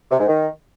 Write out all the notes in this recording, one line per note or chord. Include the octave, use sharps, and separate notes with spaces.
C3
G#2
D#3